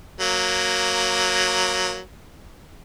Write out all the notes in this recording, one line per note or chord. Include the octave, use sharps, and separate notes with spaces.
F#3 A#3